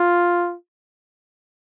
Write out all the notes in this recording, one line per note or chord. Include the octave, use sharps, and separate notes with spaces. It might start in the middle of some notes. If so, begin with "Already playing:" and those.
Already playing: F4